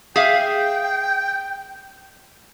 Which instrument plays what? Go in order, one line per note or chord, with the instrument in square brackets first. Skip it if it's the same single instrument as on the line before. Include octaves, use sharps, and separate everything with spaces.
[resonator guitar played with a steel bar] G#4 E5 F5 [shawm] G5